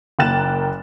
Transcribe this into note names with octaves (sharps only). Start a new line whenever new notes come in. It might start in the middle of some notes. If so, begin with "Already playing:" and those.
F#1 A#3 G5 F#6 A6 E7